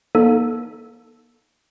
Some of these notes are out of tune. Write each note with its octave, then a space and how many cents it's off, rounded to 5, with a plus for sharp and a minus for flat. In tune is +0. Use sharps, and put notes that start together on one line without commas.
A#3 +35 D#4 +0 A4 +0